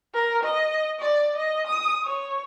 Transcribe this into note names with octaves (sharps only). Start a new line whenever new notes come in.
A#4
D#5
D5
D#5
D#6
C#5